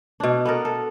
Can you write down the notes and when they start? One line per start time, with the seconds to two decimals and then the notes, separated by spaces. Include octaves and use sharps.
0.20 B2 D4
0.45 B3 A4 A#4
0.65 A4